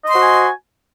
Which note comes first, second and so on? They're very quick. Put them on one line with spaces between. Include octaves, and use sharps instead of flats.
D#5 C6 C5 F#4 G#5